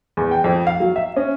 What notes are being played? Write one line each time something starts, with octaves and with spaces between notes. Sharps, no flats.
E2
G5
F2
F5
F#3
E5
C#4